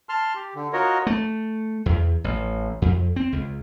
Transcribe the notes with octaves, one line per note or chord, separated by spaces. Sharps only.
A5 C6 F6
G4
D3
F4 F#4 A#4 C#5 D#5
A3
E2
A1
F2
C4
C#2